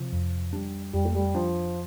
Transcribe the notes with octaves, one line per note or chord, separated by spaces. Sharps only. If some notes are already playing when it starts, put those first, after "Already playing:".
Already playing: C3 F3
F2
G3 D4
F2 G3
A3
G3
F3 D4